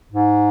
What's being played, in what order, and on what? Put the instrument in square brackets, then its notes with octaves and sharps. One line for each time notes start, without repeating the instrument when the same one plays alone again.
[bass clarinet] G#2